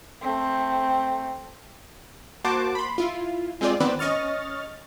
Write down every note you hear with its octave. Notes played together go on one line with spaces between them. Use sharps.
A3 C4
A#3 F#4 C5 A5 D6
B5 C6
E4 F4
G#3 C4 F4 G#4 D5
D#3 B3 C4 B4 D5
C#4 D#5 C#6 F6 A6